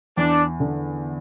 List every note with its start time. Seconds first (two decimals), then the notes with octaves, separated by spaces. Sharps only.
0.17 E2 D4
0.60 D3